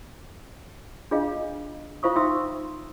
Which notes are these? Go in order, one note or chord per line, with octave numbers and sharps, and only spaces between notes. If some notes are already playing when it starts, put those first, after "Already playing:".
D4 F4 G#4 D#5 F5
F4 C5 F5 C#6 D#6
D#4 E5 G5 C6 D#6 E6